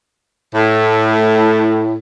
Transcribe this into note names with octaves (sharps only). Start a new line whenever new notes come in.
A2